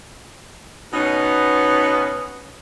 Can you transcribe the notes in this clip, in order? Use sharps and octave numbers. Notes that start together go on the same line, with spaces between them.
B2 B3 C#4 D#4